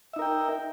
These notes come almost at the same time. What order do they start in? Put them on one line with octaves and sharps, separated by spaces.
E5 D#4 A#4 G5